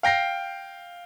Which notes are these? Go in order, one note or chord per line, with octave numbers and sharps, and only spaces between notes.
F5 G5 A#6 C7